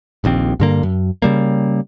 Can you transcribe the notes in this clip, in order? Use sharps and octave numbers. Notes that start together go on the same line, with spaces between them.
D#1 A#1 D#2 C4
G2 D3 A#3
F#2
C#3 G3 A#3